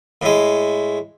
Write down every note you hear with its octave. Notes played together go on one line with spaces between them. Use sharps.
A2 G#3